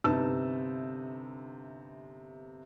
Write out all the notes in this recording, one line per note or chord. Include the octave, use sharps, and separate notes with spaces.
G1 C3 D#4 B4 A5 E6